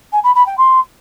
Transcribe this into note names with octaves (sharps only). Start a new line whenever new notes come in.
G#5
B5
B5
G5
C6